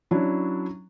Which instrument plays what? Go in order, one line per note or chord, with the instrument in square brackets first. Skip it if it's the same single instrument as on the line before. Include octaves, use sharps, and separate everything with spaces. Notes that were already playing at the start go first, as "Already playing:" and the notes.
[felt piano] F#3 C#4 D4 E4